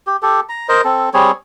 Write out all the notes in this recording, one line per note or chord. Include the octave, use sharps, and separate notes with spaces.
G4
G4 A4
A#5
A#4 C5 D#5
C4 A4
G3 C4 G#4 C#5